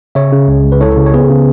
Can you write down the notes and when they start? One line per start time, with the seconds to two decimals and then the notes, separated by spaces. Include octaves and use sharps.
0.15 C#3 C#5 E5
0.32 C#3
0.48 C#2
0.64 C#2
0.72 B4
0.81 E4 A4 C#5
0.97 C#3
1.06 C#5
1.13 B3 G#4 B4
1.29 C#3